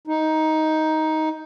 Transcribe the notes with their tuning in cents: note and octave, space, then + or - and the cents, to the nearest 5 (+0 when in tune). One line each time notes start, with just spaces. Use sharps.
D#4 +10